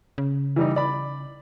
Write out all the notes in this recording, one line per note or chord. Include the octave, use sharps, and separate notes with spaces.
C#3
E3 G3 D#4
D5 B5